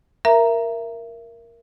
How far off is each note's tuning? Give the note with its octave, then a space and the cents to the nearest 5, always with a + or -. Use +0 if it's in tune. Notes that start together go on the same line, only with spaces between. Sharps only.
A#4 +0 E5 +25 A#5 +0